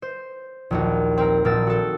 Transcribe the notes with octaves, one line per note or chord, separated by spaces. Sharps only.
C5
A#1 D#2 F#4
C4 A#4 A#5
A#1 A#2 D#4 A#4 E6 A6
F#4 A4